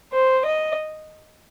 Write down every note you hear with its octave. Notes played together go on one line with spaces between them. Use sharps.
C5
D#5